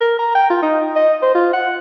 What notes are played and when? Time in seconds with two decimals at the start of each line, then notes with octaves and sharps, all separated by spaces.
0.01 A#4
0.19 A#5
0.35 G5
0.50 F4
0.63 D#4
0.96 D#5
1.23 C5
1.35 F4
1.53 F#5